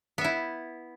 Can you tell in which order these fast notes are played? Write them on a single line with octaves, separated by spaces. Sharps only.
B3 E5 E4